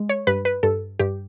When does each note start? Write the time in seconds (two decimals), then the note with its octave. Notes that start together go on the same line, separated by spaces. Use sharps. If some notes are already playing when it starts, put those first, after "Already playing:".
Already playing: G#3
0.09 C#5
0.27 G2 B4
0.45 B4
0.63 G2 A4
0.99 G2 G4